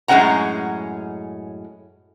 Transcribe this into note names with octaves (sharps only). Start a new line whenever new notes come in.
F#2 A2 G#3 C#4 F#5 A#5